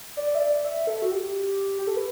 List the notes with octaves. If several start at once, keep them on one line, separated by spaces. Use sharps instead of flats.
D5
E5
D5
E5
A4
F#4
G4
G4
A4
B4